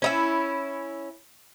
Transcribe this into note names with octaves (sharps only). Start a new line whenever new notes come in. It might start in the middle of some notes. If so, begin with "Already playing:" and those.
C#4 D#4 E4